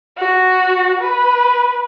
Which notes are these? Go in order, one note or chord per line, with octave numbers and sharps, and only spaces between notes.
F#4
B4